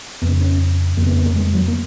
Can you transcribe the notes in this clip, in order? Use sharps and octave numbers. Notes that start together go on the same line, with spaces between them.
F2 C#3 B3
C#4
F2 C#3 A#3 B3
B3
A#3
G#3
F#3
A#3